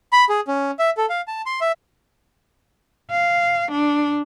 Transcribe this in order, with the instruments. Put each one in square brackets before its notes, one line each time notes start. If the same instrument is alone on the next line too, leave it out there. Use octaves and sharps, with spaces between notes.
[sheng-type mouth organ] B5
G#4
C#4
E5
A4
F5
A5
C6
E5
[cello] F5
D4